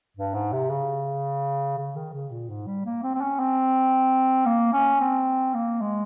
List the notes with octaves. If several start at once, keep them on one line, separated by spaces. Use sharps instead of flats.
G2
G#2
C3
C#3
C#3
D#3
C#3
A#2
G#2
G3
A#3
C4
C4
C#4
C4
A#3
C#4
C4
A#3
G#3